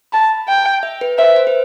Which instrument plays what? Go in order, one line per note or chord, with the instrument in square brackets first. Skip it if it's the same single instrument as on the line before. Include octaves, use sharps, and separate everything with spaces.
[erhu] A5 [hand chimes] B5
[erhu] G5
[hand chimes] E5
B4
[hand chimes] C5 [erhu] E5
[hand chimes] C5
B4